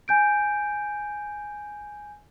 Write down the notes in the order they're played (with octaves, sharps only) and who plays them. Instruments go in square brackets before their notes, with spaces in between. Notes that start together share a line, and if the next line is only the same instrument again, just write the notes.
[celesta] G#5 G6 D7